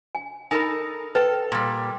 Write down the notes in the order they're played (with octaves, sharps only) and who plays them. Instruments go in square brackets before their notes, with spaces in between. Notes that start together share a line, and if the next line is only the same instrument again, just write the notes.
[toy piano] G#5
[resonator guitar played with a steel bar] D#4 A4 A#4 [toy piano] G#5 B5
[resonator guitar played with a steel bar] A4 [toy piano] B4 G5
[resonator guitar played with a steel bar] A#2 G3